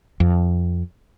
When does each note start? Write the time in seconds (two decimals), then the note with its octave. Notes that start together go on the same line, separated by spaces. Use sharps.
0.20 F2